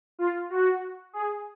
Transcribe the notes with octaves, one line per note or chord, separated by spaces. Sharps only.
F4
F#4
G#4